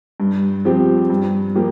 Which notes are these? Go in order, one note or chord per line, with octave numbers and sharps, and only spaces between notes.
G2
F3 C4 G4
G2
F3 A#3 G4